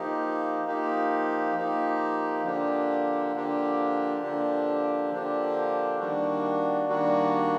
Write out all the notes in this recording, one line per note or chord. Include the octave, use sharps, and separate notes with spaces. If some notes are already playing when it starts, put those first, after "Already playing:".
Already playing: F3 A#3 D#4 G4
F3 A#3 D#4 G4
F3 A#3 D#4 G4
D3 F3 A#3 D4 G4
D3 F3 A#3 D4 G4
D3 F3 A#3 D4 G4
D3 F3 A#3 D4 G4
D#3 G3 A#3 D4 F#4
D#3 G3 A#3 D4 F#4